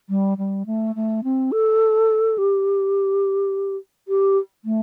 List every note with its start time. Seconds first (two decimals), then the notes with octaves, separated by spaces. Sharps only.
0.09 G3
0.38 G3
0.66 A3
0.95 A3
1.24 C4
1.52 A4
2.38 G4
4.08 G4
4.65 A3